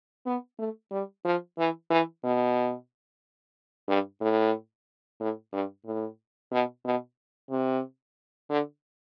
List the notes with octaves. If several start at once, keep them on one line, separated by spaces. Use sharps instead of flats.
B3
A3
G3
F3
E3
E3
B2
G2
A2
A2
G2
A2
B2
B2
C3
D3